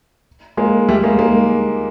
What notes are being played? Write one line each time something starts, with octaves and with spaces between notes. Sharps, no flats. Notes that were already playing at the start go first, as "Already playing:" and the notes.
G#3 A#3
G3 A3
G#3 A#3
G#3 A#3